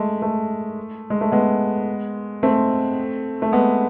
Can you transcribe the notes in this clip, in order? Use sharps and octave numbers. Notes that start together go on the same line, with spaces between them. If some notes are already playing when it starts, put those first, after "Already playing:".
Already playing: G#3 A3
A3
G#3
A3
G#3 B3
A3 C4
A3
G#3 B3